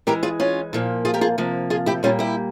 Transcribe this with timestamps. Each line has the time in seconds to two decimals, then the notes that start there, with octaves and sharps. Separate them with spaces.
0.07 E3 G#3 G4 A#4
0.23 F4 G#4
0.40 C#4 F4
0.73 A#2 F3 A#3
1.05 F4 G#4
1.14 G4 A#4
1.21 F4 G#4
1.38 C3 F3 A#3
1.70 F4 G#4
1.86 E4 G4
2.03 A#2 G3 A#3 C#4 F4
2.19 E4 G4